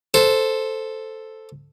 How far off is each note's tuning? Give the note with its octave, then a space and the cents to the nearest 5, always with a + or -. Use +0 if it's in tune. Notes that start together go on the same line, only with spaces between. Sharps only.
A4 +0 C5 +0